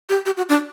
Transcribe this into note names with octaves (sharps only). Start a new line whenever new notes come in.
G4
G4
F#4
D4